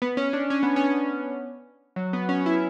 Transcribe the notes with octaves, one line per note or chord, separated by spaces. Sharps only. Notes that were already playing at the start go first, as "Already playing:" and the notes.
B3
C#4
D4
C#4
B3
C#4
F#3
B3
C#4
E4